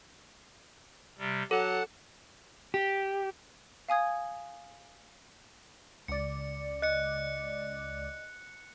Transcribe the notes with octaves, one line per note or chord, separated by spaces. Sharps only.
C3 G3
F#3 A4 F#5 A5 F#6
G4
F5 G#5 D#6 G#6
C#2 D5 C#7
D#5 F#6 C#7